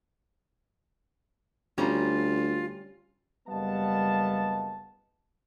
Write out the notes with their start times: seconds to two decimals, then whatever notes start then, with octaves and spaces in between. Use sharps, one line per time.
1.78 D2 G3 C#4 F4 A#5
3.48 F#1 G3 B3 D#5 F5 A5